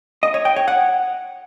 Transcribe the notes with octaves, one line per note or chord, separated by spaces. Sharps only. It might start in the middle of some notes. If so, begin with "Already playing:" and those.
D#5
C#5
G5
C#5
F#5